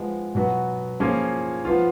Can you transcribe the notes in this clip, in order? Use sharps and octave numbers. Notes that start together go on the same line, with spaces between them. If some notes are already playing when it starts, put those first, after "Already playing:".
Already playing: F3 G#3 B3
B2 F#3 B3 F#4
F3 A#3 C#4 F4 G#4
F3 B3 F4